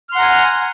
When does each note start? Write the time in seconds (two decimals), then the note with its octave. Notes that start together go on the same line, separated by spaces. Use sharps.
0.09 F6
0.12 C6
0.15 F#5
0.19 A#5
0.22 G#5